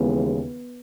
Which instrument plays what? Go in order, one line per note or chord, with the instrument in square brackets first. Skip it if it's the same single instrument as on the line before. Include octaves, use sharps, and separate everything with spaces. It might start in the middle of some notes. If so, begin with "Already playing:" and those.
Already playing: [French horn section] D#2 C#3 E3 G#3 [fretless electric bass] B3